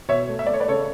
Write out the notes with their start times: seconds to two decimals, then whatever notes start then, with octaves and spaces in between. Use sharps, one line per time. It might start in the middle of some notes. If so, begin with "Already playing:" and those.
0.08 B2 C#5 E5
0.29 A3
0.39 E5
0.46 A3 D5
0.54 C#5
0.60 B4 D5
0.68 C#3 A4 C#5